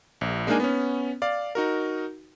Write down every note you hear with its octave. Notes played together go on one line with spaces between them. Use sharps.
A#1
G#3 A#3 D4 D#4 A#4 G#5
B3 C#4
D5 F5
D#4 F#4 A#4